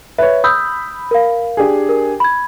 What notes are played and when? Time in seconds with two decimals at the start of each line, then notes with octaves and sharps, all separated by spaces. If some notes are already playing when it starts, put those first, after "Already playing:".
0.18 B4 C#5 E5
0.44 B5 D#6 E6 G6
1.11 A#4 F5
1.57 D4 G4 G#4
1.89 A#4
2.20 B5 G#6